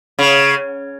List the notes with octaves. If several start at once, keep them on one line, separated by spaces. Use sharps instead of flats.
C#3